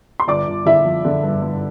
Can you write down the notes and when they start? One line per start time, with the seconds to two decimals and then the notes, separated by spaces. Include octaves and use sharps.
0.20 C6
0.28 G1 D5 D6
0.47 G1
0.66 D3 E4 E5
0.85 F3
1.05 D3
1.23 G2
1.42 G2